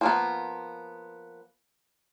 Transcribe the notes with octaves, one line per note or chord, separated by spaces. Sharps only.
F3 A#3 B3